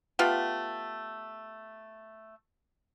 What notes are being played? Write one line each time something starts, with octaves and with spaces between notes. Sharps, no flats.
A3 B3 F4 G4